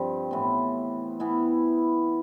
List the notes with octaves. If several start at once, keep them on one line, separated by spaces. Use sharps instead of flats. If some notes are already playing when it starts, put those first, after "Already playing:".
Already playing: G2 F3 C4 G4
A2 E3 B3
E3 B3 E4